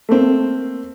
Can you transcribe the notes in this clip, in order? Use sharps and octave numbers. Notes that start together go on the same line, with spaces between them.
A3 A#3 C4